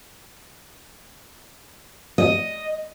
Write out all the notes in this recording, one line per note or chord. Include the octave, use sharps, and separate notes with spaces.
D#5